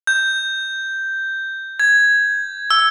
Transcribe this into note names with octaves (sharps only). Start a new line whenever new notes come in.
G6
G#6
E6